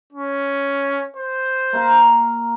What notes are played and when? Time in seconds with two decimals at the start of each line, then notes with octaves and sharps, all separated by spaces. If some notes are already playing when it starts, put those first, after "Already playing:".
0.13 C#4
1.17 C5
1.73 A#3 F5 A#5